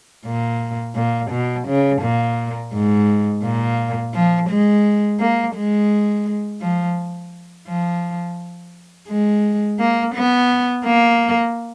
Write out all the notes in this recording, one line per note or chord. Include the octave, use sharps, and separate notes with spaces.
A#2
A#2
B2
C#3
A#2
G#2
A#2
F3
G#3
A#3
G#3
F3
F3
G#3
A#3
B3
A#3